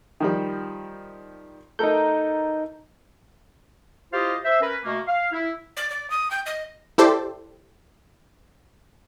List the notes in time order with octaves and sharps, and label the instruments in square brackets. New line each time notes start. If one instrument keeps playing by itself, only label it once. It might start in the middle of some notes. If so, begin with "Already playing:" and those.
[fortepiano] D#3 F3 G3
[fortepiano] A3 A4 A#4 [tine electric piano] D#4 G6
[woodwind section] E4 F4 G4 C5 D#5 F5
C5 E5
C#4 A#4 B4
B2 A3 A#3
F5
E4
[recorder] D5
D5
D#6
G5
D#5
[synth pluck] E4 G4 A4 C5 D5